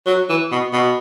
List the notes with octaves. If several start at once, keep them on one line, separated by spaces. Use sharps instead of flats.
F#3
E3
B2
B2